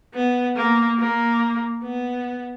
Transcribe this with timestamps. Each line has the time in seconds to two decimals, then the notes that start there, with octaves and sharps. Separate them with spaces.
0.14 B3
0.56 A#3
0.99 A#3
1.83 B3